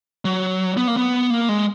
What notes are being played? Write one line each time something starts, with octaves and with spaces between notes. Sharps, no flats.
F#3
B3
A#3
B3
A#3
G#3